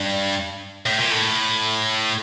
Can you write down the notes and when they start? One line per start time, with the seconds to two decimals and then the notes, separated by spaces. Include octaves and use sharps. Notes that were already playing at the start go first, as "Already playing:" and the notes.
Already playing: G2
0.86 A2
0.99 A#2
1.11 A2